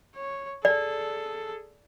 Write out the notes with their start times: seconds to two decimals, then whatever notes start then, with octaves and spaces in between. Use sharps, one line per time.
0.16 C#5
0.65 G#4 A4 D5